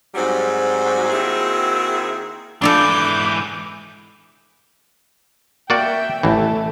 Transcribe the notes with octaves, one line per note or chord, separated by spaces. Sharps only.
G#2 F#3 G3 C4 F#4
D#3 A#3 C4 E4 F#4 G#4
G#2 E3 D4 F4 A4 D6 G6
A#3 F#4 D5 E5 G5
A1 E3 A3